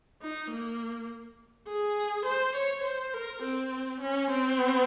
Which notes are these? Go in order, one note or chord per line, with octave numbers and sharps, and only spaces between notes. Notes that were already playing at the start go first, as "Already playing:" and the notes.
D#4
A#3
G#4
C5
C#5
C5
A#4
C4
C#4
C4